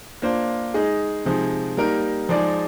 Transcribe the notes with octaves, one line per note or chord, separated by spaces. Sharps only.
A#3 D4 F4 C5
G#3 D#4 G#4 D#5
C3 F3 G#3 D#4 G#4
G3 A#3 D#4 A#4
F3 G#3 D#4 G#4 D5